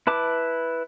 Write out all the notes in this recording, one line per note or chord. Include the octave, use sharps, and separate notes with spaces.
E4 B4 A5 D6